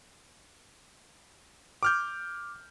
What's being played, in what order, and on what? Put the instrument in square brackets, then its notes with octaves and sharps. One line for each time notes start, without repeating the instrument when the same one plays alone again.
[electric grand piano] D6 F6 G6